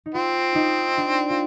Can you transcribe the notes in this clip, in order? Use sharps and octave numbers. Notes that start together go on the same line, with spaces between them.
D#4
C4 F4
D#4
D4
F4